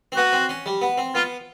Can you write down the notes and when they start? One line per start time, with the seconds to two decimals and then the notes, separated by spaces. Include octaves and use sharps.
0.12 C4
0.16 B3 F#4
0.33 C4
0.49 C#4
0.66 G3
0.81 B3
0.98 C4
1.15 B3 F4